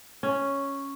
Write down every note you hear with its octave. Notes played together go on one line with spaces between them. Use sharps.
C#4